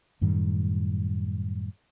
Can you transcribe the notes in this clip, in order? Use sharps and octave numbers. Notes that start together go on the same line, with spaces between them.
F#2 A2 D#3 G3